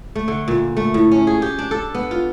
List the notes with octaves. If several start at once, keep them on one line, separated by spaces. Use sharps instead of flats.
A3
D3
A#2
A3
A2
C#4
G#4
G4
D4
A4
B3
F4